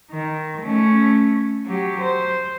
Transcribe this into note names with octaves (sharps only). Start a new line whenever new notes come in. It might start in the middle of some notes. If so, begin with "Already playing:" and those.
D#3
A3 C#4
F#3 G4
C5